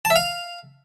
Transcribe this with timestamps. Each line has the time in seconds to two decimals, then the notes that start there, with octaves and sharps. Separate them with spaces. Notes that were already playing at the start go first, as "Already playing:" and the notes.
0.05 A5
0.10 E5
0.16 F5